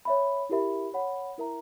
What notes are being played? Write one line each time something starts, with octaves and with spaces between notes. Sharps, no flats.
C#5 E5 B5
E4 G4 A#4 E5 B5
C#5 F#5 B5
E4 A#4 E5 A#5